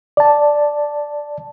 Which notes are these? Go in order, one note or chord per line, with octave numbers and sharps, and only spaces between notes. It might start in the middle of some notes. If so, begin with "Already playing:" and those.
D5 A5